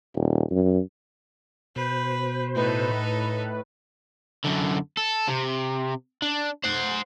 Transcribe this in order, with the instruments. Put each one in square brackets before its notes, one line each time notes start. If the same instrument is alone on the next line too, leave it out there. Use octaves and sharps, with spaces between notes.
[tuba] D#1
F#2
[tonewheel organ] B2 C5 [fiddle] B4
[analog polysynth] A2 B4 [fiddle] D#4 A4
[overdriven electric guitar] F#2 D3
A4
C3
D4
C5 F#5